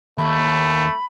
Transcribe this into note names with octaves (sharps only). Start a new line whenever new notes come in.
D#2 A3 B5